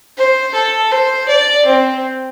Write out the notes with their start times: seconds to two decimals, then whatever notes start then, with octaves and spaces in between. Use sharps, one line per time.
0.17 C5
0.55 A4
0.92 C5
1.29 D5
1.66 C4